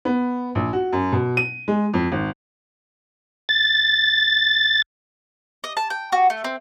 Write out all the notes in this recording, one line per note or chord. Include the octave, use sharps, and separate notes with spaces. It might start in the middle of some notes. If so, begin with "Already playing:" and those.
B3
A#1
F#4
F#2
B2
D#7
G#3
F2
G#1
A6
D#5
A5
G5
F#4
A3
C4